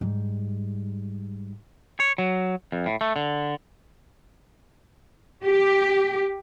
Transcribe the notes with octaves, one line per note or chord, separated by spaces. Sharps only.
G#2 G3
C#5
F#3
F2
A2
A3
D3
G4